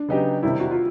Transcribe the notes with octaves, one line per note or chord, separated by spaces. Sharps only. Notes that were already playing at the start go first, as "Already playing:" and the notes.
Already playing: D4
C#3 F#3 B3 D#4 G4
C3 D#3 G3 E4
F#4
F4